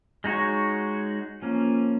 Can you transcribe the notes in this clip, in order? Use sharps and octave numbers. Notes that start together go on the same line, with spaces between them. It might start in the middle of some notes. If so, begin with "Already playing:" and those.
G#3 D#4 F#4 C#5
F3 A#3 C#4